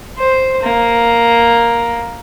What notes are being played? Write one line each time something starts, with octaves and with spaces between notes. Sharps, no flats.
C5
A#3